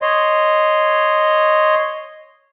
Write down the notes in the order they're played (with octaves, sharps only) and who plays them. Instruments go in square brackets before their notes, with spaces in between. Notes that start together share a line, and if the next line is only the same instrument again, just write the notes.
[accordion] C#5 D#5 C6